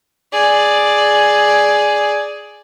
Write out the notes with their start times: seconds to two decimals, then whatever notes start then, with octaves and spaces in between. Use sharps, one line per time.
0.32 G#4 D5